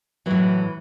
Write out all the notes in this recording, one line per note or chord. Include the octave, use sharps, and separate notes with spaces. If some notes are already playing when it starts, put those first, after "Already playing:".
A2 E3 F#3 E4